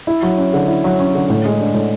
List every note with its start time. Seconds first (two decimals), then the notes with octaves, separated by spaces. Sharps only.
0.07 E4
0.23 F#3
0.38 C#4
0.53 D3
0.68 E4
0.84 F#3
0.99 C#4
1.15 D3
1.30 A2
1.45 G#3
1.60 D4
1.74 A2